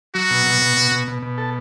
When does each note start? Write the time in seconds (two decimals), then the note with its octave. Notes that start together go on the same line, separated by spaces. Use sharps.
0.15 F#3 F#4
0.31 B2
0.46 B2
0.62 B2
0.77 B2
0.92 B2
1.08 B2
1.23 B2
1.38 A4